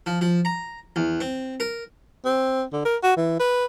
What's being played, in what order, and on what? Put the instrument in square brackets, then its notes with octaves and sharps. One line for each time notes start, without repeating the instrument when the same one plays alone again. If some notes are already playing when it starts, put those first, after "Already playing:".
[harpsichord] F3
F3
A#5
E2
C4
A#4
[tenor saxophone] C4
D3
A#4
F#4
E3
B4